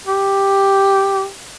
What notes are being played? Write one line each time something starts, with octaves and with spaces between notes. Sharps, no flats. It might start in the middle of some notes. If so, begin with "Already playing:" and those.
G4